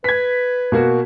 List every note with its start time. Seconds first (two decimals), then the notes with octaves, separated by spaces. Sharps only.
0.04 B4 G#6 B6
0.72 B2 A#3 F#4